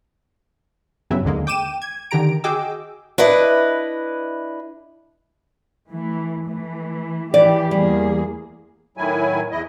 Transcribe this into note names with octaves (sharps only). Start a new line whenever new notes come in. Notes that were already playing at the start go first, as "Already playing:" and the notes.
G2 C#3 F#3 B3 E4
D#2 D3 G#3 A#3
G5 D6 D#7 E7
G#6
D3 D#3 G4 A#5 D7
F#4 G#4 D#5 G5 D6 E6
D4 E4 B4 D#5
E3 A3
E3 A3
E3 G4 D5
E2 G3 A#3 G#4
A2 D#3 F#3 E4 G#5
E2 E4 D#5